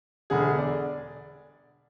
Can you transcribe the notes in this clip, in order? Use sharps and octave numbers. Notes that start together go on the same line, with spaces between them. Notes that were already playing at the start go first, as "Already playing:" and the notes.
E1 D3 G#4
D5